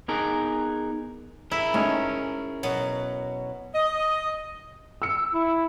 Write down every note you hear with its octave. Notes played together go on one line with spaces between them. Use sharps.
B3 D#4 G#4 A#4
E4 G#4 A#4
G#3 A3 C#4 D#4
B2 F#3
D#5
E6 C#7
E4